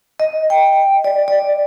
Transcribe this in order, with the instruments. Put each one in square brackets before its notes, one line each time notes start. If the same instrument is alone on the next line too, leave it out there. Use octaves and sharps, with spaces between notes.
[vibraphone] D#5
G5
D5
D5